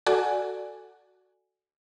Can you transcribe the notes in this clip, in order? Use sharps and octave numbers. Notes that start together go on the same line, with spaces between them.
F#4 A4 D5 F#5 G#5